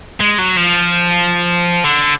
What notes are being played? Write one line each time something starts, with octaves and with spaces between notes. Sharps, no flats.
G#3
F#3
F3
D3